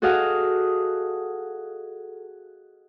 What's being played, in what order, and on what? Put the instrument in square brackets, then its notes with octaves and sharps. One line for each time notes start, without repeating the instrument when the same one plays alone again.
[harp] F#4 G#4 A4 D#5 F5 F#5